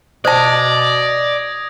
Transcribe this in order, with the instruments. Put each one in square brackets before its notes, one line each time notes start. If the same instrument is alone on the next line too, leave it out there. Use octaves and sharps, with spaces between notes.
[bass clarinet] B2 [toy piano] C5 A5 [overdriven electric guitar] D5 [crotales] D#6 G#6 A#6